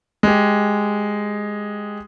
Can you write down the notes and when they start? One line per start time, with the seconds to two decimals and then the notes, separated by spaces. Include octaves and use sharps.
0.23 G#3 G4